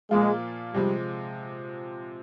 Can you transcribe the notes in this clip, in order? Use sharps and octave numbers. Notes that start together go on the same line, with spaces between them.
A#2 F3 G#3 A#3 F4
C3 F3 G3 G#3